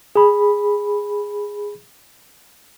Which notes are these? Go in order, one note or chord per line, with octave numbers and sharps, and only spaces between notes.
G#4 B5